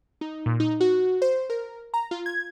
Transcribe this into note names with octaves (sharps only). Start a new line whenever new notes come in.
D#4
A#2
D#4
F#4
C5
A#4
A#5
F4
G#6